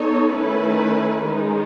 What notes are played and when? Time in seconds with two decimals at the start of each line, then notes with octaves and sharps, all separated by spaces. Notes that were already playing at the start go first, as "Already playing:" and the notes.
Already playing: B3 D#4 A4 C#5
0.32 D#3 A3 C#4 E4 B4
1.24 D#3 G#3 D#4